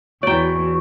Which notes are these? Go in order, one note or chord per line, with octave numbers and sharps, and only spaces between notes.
E2 E3 F#4 C#5 D5 G5 A#5